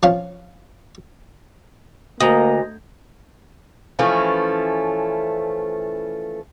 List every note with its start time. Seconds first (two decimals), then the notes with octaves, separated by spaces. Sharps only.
0.03 F3 C#4 F5
2.20 D2 A#3 D#5 A#5
3.99 E3 F3 A3 C#4